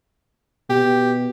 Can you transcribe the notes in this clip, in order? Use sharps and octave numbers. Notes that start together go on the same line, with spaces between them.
B2 G4